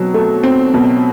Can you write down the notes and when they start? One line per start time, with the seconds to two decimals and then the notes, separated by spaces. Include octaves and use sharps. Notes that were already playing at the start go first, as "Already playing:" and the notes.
Already playing: B2 F#3 C4
0.14 A3
0.44 C4
0.74 B2